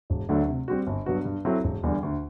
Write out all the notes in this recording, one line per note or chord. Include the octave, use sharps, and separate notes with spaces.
E1
D2 D3 F#3 A3
C3
G3 C4 F#4
G1
G2 F#3 B3 F#4
G2
F#3 C4 E4 A4
E1
E2 D3 G3
D2